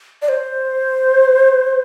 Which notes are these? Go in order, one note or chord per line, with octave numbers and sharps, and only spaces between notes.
D5
C5